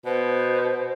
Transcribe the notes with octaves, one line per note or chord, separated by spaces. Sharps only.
B2 C5